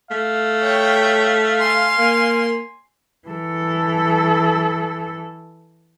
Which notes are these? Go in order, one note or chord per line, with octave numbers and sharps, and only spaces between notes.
A3 F5
C#5 G5
G#5 C6
A#3
E3 A4